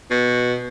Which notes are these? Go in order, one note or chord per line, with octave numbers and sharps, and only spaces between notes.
B2